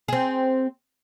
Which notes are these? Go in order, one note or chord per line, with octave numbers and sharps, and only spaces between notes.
C4 G#4